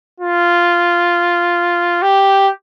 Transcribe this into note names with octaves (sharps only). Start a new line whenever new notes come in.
F4
G4